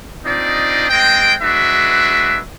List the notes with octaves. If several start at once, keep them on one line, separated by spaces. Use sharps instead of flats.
C4 D4 D#4 F4 D5 D#5
G#3 C4 D#5 G5
G#3 D4 F#4 B4 E5